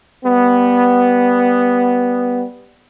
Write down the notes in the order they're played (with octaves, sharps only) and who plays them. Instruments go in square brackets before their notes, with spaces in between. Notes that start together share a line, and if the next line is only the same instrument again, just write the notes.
[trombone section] G3 B3